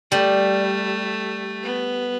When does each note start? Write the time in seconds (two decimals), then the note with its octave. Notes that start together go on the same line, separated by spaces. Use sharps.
0.11 G3 A3
1.63 B3